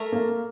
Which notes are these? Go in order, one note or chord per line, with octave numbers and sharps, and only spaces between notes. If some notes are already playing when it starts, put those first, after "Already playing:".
Already playing: A3 A#4
A#3